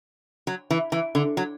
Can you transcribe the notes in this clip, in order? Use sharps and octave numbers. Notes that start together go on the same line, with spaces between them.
F#3
E3
E3
D3
F#3